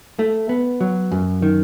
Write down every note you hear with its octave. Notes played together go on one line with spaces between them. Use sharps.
A3
B3
F#3
F#2
D#3